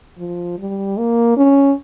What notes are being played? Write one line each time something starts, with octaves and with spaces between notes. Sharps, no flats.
F3
G3
A#3
C#4